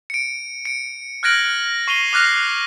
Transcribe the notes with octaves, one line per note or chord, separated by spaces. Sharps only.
C#7 D7
C#7 D7
F6 F#6 G#6 A#6 D7 F#7
C#6 C7 D#7 F7 G7
D6 F6 F#6 A#6 C7